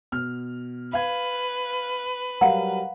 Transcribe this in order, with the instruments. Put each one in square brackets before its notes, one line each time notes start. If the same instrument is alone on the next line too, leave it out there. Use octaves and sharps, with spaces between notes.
[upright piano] B2 F6
[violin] B4 [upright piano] F5 G#6
[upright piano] F#3 G3 A#4 [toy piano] F5 F#5 A#5